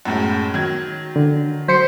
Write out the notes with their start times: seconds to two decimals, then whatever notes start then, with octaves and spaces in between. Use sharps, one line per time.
0.05 F#2 A2 G#3
0.54 D#3 F#3 G#6
1.16 D3
1.68 F#3 C5 B6 C#7